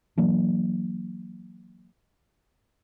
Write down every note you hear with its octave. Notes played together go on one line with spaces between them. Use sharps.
E3 F#3 A#3 D4